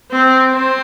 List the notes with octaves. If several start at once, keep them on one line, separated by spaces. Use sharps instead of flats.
C4
C4